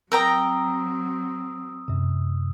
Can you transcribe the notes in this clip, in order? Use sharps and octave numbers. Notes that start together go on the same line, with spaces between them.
F#3 C4 A#4 G5 A#5 D#6 E6
F#2 C3